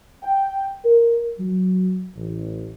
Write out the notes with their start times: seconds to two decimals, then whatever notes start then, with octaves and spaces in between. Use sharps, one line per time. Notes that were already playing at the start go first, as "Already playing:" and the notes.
0.23 G5
0.85 A#4
1.39 F#3
2.16 A1